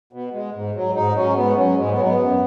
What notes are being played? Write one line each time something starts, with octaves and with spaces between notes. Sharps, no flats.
B2
G#3
G#2
F#3
G#2 D#4
F#3 C#4
G#2 B3
F#3 C#4
G#2 G#3
B3
F#3 G#3
B3
F#2